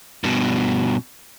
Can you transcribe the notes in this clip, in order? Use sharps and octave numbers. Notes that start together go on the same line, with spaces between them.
G2 B2